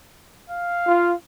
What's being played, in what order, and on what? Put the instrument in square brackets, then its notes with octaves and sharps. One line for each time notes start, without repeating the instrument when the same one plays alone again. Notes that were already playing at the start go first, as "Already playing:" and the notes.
[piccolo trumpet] F5
[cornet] F4